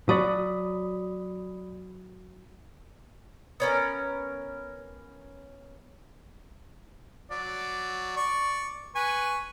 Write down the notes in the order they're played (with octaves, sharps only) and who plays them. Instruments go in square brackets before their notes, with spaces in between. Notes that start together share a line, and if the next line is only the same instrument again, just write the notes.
[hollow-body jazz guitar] F#3 [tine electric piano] D5 B5 D#6
[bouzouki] B3 C#4 A#4
[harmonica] F#3 [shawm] D5
[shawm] D5 [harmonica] C#6
[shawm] B4 [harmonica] G#5 C#6